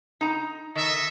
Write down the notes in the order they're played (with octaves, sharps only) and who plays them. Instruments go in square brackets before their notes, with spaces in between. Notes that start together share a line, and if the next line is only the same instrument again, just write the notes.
[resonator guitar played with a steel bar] D#4 A#5
[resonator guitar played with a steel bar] D#3 [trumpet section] A4 D#5 E5